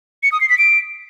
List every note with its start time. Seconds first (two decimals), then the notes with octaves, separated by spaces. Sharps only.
0.23 C#7
0.32 D#6
0.41 C7
0.50 B6
0.58 D7